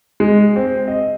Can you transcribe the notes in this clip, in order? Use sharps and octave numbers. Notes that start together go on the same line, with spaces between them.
G#3
C4
D#5